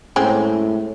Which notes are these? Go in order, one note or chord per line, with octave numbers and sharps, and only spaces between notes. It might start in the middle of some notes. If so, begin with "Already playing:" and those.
A2 G#3 C4 C#4